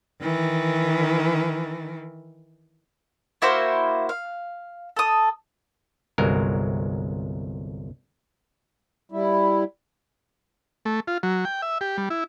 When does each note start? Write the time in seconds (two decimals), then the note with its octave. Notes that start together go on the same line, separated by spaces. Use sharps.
0.21 D#3 E3
3.42 A#3 E4 F#4 C5
4.09 F5
4.96 A4 D#6
6.18 G1 C2 F#3 G#3 A#4
9.12 G3 E4
10.86 A3
11.07 F4
11.23 F#3
11.45 G5
11.62 E5
11.81 G4
11.97 G3
12.10 E4